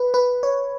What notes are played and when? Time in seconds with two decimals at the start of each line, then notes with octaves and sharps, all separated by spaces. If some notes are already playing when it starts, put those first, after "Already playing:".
Already playing: B4
0.14 B4
0.43 C#5